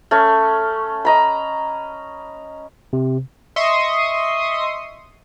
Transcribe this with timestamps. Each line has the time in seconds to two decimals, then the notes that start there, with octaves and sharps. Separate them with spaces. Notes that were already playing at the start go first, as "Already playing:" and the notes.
0.11 A3 C#4
1.05 D#5 A#5 B5
2.93 C3
3.56 D#5 E5 C6 C#6 D#6